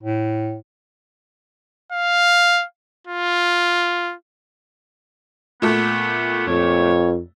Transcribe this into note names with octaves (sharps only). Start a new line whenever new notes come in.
A2
F5
F4
A#2 A3 B3
F2 C#5